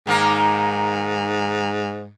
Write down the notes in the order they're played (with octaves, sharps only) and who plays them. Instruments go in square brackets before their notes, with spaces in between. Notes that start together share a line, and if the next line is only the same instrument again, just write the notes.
[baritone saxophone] G#2 [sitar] D#3 A#3 A#4